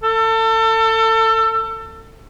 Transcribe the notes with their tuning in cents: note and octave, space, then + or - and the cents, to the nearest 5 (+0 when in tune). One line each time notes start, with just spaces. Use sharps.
A4 +30